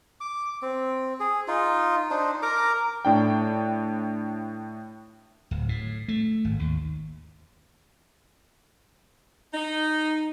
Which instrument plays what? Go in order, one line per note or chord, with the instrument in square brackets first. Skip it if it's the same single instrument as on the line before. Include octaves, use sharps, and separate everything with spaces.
[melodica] D6
C4
G#4
D#4 F4
D4 D#4 C5
A#4 A#5 D6
[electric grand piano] A2 D4 G5
[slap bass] D1
A2
A3
G#1
D#2
[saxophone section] D#4